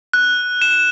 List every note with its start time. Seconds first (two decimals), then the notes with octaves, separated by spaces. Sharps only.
0.13 F#6
0.62 E7